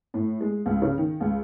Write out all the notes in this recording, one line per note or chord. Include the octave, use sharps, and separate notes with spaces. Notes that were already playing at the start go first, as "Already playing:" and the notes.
A2
G#3
C#2
C#3
D#3
C#2